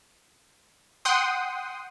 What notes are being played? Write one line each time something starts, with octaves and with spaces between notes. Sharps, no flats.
F#5 G5 C6 D#6